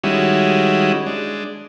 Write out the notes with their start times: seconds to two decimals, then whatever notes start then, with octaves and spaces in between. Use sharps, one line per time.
0.04 D#3 G3 G#3 C#4 E4 F#4
1.06 G#3 D4